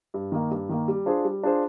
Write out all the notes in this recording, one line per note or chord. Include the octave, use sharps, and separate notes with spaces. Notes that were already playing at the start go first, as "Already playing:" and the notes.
G2
D#3 A#3
G2
D#3 A#3
G3
D4 F4 G#4 C5
G3
D4 F4 G#4 C5